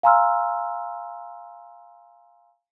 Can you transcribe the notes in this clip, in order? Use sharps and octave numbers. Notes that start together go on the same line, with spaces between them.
F5 G#5 A#5 C6 E6 F6